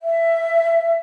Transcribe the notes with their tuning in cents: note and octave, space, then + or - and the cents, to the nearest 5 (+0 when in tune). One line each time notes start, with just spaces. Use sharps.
E5 +15